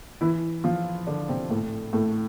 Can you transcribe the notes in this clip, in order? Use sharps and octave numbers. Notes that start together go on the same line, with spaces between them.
E3 E4
F3 F4
D3 D4
C3 C4
A2 A3
A2 A3